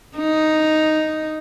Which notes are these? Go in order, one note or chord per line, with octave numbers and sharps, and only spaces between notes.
D#4